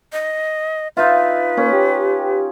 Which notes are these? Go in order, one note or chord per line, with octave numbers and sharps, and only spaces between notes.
D#5
D#4 F4 B4 E5
A#3 C#4
G4